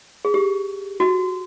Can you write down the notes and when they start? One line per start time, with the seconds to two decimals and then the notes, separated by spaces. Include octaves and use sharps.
0.25 G#4
0.34 G4
1.00 F#4